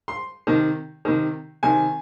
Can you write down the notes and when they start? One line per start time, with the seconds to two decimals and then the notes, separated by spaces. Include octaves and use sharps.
0.08 C6
0.47 C3 D#3
1.05 C3 D#3
1.63 C3 D#3 G#5